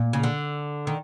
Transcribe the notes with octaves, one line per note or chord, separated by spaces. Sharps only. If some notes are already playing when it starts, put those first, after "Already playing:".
Already playing: A#2
C#3
D3
D#3